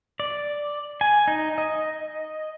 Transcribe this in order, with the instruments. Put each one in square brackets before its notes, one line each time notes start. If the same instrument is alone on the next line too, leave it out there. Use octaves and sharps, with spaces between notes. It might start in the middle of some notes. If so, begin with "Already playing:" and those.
[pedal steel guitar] D5
G#5
D#4
D#5